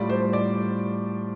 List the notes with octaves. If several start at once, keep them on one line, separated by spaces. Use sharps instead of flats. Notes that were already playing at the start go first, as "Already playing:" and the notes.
Already playing: A2 G3 F4 D5
C5
D5